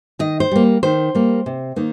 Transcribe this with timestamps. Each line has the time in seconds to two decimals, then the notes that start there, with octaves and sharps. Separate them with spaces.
0.19 D#3 D#5
0.40 C5
0.51 G3 A#3
0.83 D#3 C5
1.15 G3 A#3
1.46 C3
1.76 D#3 A#3 D#4